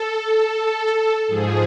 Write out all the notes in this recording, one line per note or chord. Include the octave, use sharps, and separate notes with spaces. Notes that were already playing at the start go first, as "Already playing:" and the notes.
Already playing: A4
G#2 F3 G#4